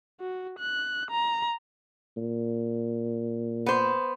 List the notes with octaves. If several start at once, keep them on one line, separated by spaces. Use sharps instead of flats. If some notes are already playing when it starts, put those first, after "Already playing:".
F#4
F#6
A#5
A#2
B3 C5